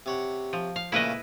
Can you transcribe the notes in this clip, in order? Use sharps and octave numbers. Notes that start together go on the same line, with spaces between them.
C3 C#5 F#5
F3
F5
A#2 C#3 A3 E4 B4 D#5